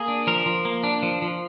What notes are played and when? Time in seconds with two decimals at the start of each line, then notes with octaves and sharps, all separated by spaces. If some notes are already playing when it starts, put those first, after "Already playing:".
Already playing: A#3 G#4
0.08 D4
0.27 F3 A#4
0.46 F3
0.65 A#3
0.84 D4
1.03 F3
1.22 F3